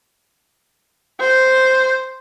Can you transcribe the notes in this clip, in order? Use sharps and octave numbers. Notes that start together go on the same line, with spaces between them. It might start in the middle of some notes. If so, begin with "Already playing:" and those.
C5